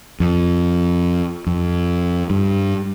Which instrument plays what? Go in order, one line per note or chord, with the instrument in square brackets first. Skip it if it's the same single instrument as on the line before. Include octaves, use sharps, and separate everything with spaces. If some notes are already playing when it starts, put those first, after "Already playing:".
[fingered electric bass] F2
F2
G2